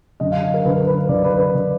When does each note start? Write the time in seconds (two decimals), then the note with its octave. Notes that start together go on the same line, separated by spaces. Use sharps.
0.20 F#2 D3 D#5
0.32 F5
0.43 D#5
0.54 A#4
0.65 F#2 D3 B4
0.76 A#4
0.87 B4
0.99 B4
1.09 F#2 D3 D5
1.24 B4
1.39 B4
1.54 D3 D5